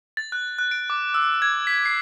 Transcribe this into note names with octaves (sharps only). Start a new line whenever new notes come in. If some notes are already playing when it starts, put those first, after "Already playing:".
A6
F#6
F#6
D7
D6
E6
G#6
B6
C7